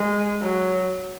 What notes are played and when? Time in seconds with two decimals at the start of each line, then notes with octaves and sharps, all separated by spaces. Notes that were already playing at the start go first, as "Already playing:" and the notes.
Already playing: G#3
0.41 F#3